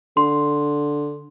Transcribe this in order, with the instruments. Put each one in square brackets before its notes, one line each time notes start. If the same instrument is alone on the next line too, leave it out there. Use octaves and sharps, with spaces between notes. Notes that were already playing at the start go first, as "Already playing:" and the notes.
[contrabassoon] D3 [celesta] C6